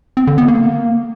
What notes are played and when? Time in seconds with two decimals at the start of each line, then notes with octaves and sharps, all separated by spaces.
0.17 C4
0.27 D3
0.38 B3
0.48 A#3